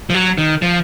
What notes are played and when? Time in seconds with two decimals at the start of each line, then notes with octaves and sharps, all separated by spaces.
0.10 F3
0.14 F#3
0.38 D#3
0.62 F3